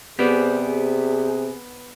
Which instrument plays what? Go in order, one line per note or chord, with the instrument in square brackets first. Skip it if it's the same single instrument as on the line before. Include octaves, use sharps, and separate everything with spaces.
[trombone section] C3 G#4 [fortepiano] B3 [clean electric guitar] G4 C5 D5